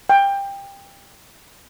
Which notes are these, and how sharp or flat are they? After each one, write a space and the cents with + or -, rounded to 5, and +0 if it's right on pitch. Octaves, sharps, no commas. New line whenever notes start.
G5 +20